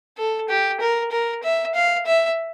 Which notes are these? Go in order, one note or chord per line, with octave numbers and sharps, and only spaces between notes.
A4
G4
A#4
A#4
E5
F5
E5